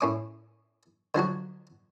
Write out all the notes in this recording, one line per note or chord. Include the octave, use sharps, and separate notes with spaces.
A2 C#4 D6
D3 F3 F#3 F#4